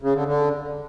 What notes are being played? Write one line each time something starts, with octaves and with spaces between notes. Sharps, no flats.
C#3
D3
D3